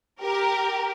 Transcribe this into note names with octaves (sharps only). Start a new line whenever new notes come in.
G4 A#4